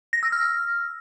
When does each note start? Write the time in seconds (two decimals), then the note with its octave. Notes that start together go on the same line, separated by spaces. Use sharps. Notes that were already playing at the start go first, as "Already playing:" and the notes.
0.13 A#6
0.23 E6
0.32 F6